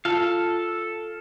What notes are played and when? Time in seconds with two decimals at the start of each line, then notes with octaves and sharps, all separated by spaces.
0.05 F4 A4 F5 A5